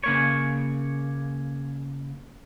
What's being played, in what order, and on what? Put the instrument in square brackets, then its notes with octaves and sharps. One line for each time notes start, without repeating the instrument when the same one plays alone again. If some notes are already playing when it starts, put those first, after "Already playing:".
[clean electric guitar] C#3 A#3 C#5